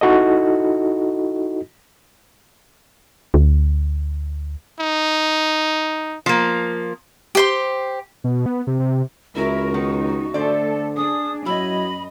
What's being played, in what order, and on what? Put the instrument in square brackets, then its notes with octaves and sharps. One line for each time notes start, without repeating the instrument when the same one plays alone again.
[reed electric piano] D#4 E4 F#4 A4 D#5
[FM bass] D2
[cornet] D#4
[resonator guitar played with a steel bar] F3 A#3
[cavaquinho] G4 C5 C6
[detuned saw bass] B2
B3
C3
C3
[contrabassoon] C#2 [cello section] E4 A#4 [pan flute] F#4
[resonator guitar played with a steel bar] D#3 B3 [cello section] D#4
[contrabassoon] D3 [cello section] A3 A4 [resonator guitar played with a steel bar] C5 D5
[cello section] D4 G#4 [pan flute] D#6
[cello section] F#2 D#5 [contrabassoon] F#3 [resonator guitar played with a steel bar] E4 [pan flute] B5